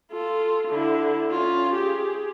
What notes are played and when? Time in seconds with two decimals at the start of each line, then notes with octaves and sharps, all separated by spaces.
0.12 F4 A4
0.69 D3 E4
1.31 C#4 F4
1.75 G4 G#4